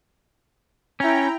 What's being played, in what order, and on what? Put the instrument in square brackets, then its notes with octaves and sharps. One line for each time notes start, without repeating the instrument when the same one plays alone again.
[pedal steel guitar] C#4 [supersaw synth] E4 G5 A#5